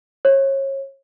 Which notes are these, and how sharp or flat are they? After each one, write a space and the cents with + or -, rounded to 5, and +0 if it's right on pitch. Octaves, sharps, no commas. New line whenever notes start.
C#5 -30